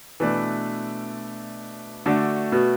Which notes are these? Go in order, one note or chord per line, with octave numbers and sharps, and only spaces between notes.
B2 E3 A3 D4 B4 D5
D3 A3 F#4 D5
B2